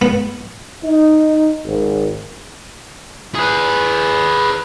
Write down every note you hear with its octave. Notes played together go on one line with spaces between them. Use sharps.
B3
D#4
G#1
G#4 B4